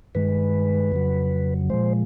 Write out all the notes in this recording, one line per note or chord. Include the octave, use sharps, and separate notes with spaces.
G2 D#3 G#3 B4
F2 C#3 F#3
A#2 F3 G#3 C5